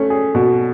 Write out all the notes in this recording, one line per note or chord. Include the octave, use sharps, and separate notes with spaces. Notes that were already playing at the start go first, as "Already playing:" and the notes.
Already playing: A3 C#4
G#4
B2